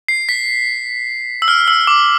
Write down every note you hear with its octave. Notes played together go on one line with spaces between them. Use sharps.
C7
B6
E6
F6
E6
D6